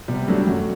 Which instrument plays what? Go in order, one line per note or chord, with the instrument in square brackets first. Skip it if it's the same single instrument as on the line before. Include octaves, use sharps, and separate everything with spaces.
[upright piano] C3 [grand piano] G3 B3
[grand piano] F#3 A3 [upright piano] G3 D4
[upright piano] F#2 [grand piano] F#3 A3